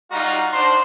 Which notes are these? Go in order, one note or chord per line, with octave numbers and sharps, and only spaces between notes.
G3 D#4 F4 F#4 A#5
D4 D#4 C5 C6